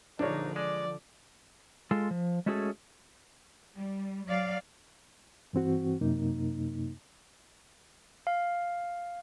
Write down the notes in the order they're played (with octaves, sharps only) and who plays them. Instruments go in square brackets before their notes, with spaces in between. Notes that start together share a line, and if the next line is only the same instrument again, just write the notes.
[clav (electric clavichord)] A#1 A#3 [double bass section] D3 F3 [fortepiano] D4 C#5 [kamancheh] D#4
[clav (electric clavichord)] G#3 [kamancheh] D5
[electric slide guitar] G#3 F4 A4
F3
G#3 A3 C#4 F#4 G#4 A4
[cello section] G3
F#3 D5 F5
[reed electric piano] G2 E3 C4 F#4
F#2 C3 A#3 D#4
[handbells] F5